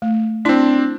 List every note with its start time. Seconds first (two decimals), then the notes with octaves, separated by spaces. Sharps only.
0.02 A3
0.45 C4 D4 E4 C6